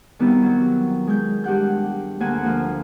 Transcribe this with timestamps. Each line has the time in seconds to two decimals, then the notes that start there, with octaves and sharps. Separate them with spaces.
0.19 D#3 G3 B3 C4 E4
0.43 F#3
1.07 G#3 G6
1.44 G2 G4 F#5 G6
2.20 D2 A#3 F#5 G#5
2.44 F3 A#3 F4